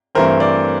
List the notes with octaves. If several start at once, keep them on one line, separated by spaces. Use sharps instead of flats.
G2 E3 A3 C4 A#4 C5
C5 D5